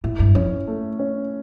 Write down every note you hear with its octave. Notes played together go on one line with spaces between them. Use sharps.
A2 E4
G2
F2 C#4
A3
C#4